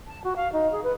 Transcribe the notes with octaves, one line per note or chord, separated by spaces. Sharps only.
A5
F#4
F5
D#4
G#4
B4